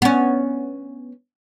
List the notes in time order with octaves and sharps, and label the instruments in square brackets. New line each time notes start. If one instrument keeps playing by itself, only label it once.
[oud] B3 C#4